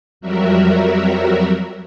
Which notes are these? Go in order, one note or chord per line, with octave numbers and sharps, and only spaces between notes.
F2 F#3 G3 F#4 A#4 E5